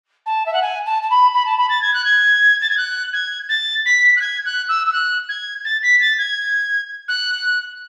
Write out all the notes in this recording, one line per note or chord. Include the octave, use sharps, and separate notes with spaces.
A5
E5
F#5
G#5
A5
A5
B5
B5
A5
B5
A6
G#6
F#6
G#6
A6
G#6
F#6
G#6
A6
B6
F#6
G#6
F#6
E6
E6
F#6
G#6
A6
B6
A6
G#6
F#6